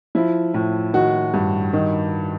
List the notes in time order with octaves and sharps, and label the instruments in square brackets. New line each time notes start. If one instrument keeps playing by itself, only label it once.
[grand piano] F3 [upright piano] E4
[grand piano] A2
[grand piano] D#3 [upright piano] F#4
[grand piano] G2
D#3